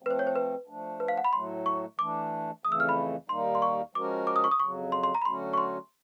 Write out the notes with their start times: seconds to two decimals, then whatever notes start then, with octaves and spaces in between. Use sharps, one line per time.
0.02 F3 A3 C4 B4
0.10 C5
0.19 C#5
0.27 C5
0.36 B4
0.67 F3 A3 D4
1.00 B4
1.08 F5
1.18 F#5
1.24 B5
1.33 A2 F#3 A3 C6
1.66 C#6
1.99 E3 A3 D4 D6
2.64 F2 C#3 E3 A3 D#6
2.72 E6
2.80 F6
2.89 B5
3.29 D#2 D#3 G3 A#3 D#4 C6
3.55 C6
3.62 C#6
3.95 F3 G#3 C#4 F#4 A#4 D6
4.27 D6
4.36 D#6
4.44 C#6
4.52 D#6
4.60 F2 C#3 F#3 C#6
4.92 C6
5.04 C6
5.15 A#5
5.22 B5
5.25 D3 F#3 A3 C#4 F#4 C6
5.53 C#6
5.58 C6